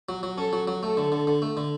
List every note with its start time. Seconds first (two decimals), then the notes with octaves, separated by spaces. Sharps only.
0.09 F#3
0.23 F#3
0.37 C#4 A4
0.53 F#3
0.68 F#3
0.82 A3 A4
0.97 D3
1.12 D3
1.27 D3
1.42 A3
1.57 D3